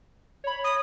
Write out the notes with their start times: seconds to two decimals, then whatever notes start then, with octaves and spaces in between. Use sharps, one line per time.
0.44 C#5 B5
0.64 D#6